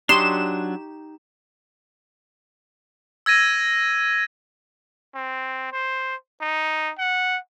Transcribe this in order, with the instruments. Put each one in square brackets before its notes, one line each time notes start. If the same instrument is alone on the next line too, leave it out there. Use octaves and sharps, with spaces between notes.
[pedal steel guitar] F#3 D4 [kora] D#4 G4 C#5 [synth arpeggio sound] C6 [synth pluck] E7
[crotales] E6 G#6 A#6 D#7
[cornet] C4
C5
D#4
F#5